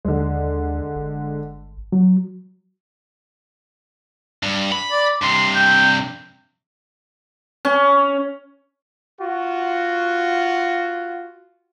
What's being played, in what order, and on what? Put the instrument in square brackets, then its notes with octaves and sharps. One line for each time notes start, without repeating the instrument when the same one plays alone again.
[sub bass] D#2 [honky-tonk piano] D3 G#3
[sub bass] G1
[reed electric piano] F#3
[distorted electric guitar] G2
B5
[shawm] D5
[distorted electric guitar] G2 C3 [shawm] C6
[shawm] G5
[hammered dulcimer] C#4
[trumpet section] F4 F#4